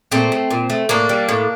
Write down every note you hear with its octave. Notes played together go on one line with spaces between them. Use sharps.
A#2 A3 C4
A3
A#2
A3
A2 A#3 D4
G3
A2